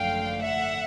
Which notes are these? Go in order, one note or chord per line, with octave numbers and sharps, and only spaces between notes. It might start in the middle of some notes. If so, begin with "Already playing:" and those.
Already playing: G#1 F#2 D3 F3 A3 F5 G5
E5 F#5